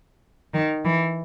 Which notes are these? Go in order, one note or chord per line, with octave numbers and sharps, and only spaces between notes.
D#3
E3